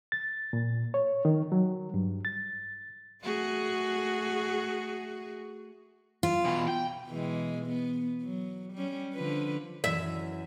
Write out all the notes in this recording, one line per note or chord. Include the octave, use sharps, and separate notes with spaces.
A6
A#2
C#5
D#3
F#3
G2
A6
A3 F#4 G#4
F4
B2 E3
G5
B2 E3 G#3
B3
F#3
G3 C#4
D3 F3 B4
F#2 E3 E5